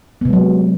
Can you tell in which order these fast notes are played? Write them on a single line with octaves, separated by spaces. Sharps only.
B3 C3 G#3 F#3